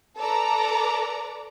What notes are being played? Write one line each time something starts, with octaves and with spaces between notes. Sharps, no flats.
A4 B4 D5 A#5